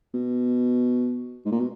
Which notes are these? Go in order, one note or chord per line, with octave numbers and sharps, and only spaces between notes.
B2
G#2
A#2
B2